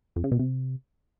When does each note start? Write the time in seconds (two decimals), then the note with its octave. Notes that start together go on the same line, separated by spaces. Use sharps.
0.16 F2
0.24 C#3
0.32 B2
0.39 C3